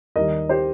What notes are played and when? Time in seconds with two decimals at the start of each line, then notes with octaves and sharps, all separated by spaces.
0.16 D#2 D#3 G3 A#4 D#5
0.49 G4 C5